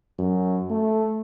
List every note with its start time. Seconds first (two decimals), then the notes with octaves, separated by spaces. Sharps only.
0.19 F#2
0.70 A3